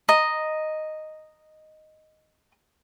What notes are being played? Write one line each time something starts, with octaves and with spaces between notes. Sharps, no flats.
D#5 A#5